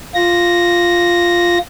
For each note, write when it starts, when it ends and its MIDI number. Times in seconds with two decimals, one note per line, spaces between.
0.14 1.58 65
0.14 1.58 94